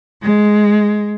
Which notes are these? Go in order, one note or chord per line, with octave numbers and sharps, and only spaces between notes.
G#3